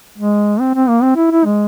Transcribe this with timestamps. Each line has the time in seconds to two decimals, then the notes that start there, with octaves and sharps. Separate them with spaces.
0.18 G#3
0.60 C4
0.75 C4
0.88 A#3
1.02 C4
1.16 E4
1.31 E4
1.45 G#3